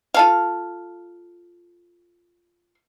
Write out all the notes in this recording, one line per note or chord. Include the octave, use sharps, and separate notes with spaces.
F4 A4 F5